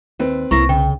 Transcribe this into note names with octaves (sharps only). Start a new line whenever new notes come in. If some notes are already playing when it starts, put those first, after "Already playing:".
D#2 C4 B4
C2 A#3 E4 A#5 C#6 A#6
C#3 G5